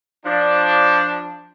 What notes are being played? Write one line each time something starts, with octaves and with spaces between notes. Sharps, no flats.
F3 D4